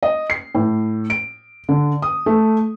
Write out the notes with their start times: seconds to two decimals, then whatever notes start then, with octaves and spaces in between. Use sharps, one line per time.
0.03 D#5
0.30 C7
0.55 A2
1.10 D7
1.69 D3
2.02 D#6
2.26 A3